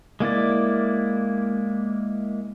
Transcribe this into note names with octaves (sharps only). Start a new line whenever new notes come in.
G#3 A#3 E4 D5